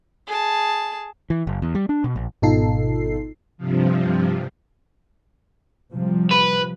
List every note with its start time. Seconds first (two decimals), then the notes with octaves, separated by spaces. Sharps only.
0.27 G#4 A5
1.30 E3
1.47 F#1
1.62 E2
1.75 G3
1.89 D4
2.04 B2
2.16 A#1
2.42 G#1 B2 D#4 F4 A4 C7
3.58 G2 C3 F3
5.92 C3 F3 G3
6.31 B4